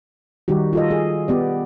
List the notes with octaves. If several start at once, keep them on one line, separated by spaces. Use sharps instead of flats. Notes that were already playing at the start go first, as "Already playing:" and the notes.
D#3 G3 D#4 F#4 G4
F4 A4 D#5
G#4
B3 G4 D5